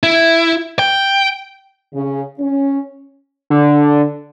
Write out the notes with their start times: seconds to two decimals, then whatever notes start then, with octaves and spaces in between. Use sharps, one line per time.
0.03 E4
0.79 G5
1.93 C#3
2.39 C#4
3.50 D3